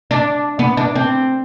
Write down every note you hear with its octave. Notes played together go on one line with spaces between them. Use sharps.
D4
B3
D4
C4